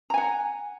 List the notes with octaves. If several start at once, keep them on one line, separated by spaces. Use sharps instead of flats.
F#5 G#5 A#5